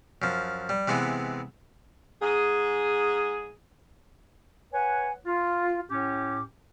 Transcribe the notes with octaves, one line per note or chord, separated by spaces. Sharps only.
F#2 F3
G3
C3 E3 G#3 B3
G#2 G#4
B4 C#5 F#5 G#5
F4
A2 C#4 G4 D6